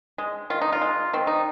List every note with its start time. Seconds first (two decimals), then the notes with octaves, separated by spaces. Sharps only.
0.18 G#3
0.50 D#3 F4
0.62 D#4
0.73 F4
0.82 G#3
1.13 D#3 C4
1.27 D#4